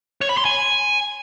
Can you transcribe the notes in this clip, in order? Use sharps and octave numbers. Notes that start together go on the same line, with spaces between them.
C#5
B5
C6
G#5